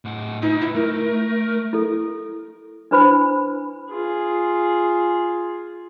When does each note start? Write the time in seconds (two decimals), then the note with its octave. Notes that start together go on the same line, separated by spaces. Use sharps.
0.05 A2 F#5
0.42 D#4 F4 B4
0.61 E4
0.75 A3 A#4
0.95 A#4
1.73 E4 A4
2.91 D4 E4 B4 C5 B5
3.91 F4 G#4